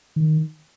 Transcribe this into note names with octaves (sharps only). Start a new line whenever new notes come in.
D#3